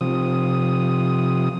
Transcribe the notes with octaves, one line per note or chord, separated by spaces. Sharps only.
C3 F3 D#6